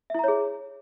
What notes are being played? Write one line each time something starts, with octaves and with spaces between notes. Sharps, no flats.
E4 G#4 C#5 E5 A#5